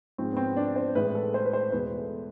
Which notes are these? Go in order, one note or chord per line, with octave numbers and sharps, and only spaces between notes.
G#2 F3 G#3 C4
B3
C4
D4
C5
A2 E3 G#3 B4
A4
C5
B4
C5
E2 B2 G#3 B4
A4